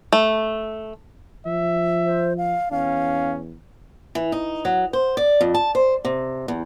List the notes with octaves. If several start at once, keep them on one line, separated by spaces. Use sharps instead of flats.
A3
F3 E5
C5
F5
E2 C#4 F5
E3
D#4
F#3
C5
D5
F2
A5
C5
C3
E2